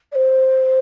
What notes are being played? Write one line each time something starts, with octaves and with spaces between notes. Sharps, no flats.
D5
C5